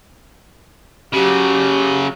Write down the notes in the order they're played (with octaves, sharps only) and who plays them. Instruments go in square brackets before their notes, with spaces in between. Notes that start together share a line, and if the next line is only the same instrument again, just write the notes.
[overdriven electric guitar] C#3 F#3 [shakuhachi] G4